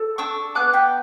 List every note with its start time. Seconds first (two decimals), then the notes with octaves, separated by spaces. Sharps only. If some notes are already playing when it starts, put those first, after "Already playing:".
Already playing: A4
0.18 D4 C#6 E6
0.55 B3 D6 F#6
0.73 G5 B5